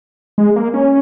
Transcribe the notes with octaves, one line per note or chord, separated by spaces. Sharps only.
G#3
A#3
C#4